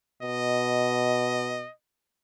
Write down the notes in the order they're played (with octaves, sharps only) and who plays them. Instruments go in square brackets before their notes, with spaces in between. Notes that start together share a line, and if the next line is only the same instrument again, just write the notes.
[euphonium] B2 [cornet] D#5